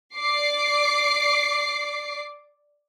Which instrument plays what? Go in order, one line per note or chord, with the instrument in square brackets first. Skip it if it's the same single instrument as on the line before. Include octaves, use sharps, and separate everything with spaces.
[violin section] D5 D6 C7